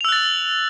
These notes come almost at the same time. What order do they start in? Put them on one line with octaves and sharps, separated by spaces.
F7 E6 F#6 A6 F#7